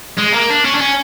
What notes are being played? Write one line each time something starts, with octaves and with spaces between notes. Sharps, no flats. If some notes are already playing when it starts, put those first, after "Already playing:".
G#3
A#3
D4
C#4
D4
C#4